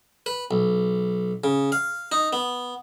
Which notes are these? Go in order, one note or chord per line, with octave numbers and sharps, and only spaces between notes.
B4
B1
C#3
F5
D#4
B3